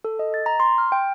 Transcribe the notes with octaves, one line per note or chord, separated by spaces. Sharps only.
A4
D#5
A6
A#5
C6
F6
G5